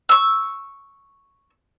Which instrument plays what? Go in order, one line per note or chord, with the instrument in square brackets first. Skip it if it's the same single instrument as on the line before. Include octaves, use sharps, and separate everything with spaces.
[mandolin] C#6 E6